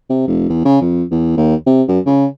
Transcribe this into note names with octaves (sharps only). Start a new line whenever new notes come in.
C3
F1
E2
C#3
F2
E2
D#2
C3
F#2
C#3